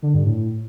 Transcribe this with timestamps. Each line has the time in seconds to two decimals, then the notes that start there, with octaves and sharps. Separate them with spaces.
0.03 D3
0.14 G2
0.26 A2